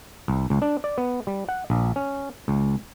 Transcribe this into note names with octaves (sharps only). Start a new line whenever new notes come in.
C2
C#2
D4
D5
B3
G3
F#5
A#1
C#4
C#2